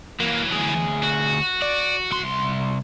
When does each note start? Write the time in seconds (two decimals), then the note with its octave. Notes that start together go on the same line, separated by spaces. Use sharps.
0.20 E3 F#3 A#3
0.52 D2 G#4
1.03 F#4
1.62 D5
2.11 C2 C6